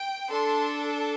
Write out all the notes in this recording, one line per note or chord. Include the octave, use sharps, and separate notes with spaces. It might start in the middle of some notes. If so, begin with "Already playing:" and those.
Already playing: G5
D4 A4 C6